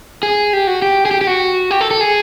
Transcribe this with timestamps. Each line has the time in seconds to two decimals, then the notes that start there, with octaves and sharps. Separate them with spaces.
0.23 G#4
0.53 G4
0.67 F#4
0.82 G4
1.05 G#4
1.11 G4
1.21 G4
1.27 F#4
1.71 G4
1.81 A4
1.91 A4
2.01 G#4